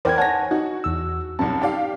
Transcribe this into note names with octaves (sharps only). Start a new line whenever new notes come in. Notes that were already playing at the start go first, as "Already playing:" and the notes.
E2 A#4 C5 D5 G5 G#6
C#5 F#5 G#5 A5 G#6 A#6
D#4 F#4
E2 E6
C2 F#2 A5
G4 D5 F5